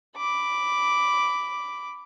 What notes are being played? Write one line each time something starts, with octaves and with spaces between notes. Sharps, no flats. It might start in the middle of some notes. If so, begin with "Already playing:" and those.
B5 D6